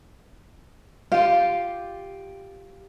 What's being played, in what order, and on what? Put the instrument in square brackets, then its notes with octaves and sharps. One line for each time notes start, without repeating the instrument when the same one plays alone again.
[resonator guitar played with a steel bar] F4 G4 [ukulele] F5